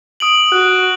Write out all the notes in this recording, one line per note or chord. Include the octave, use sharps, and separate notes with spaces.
D#6 D7 F#7
F#4 F#6